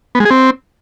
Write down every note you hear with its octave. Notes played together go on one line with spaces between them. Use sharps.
B3
G#3
G#4
C4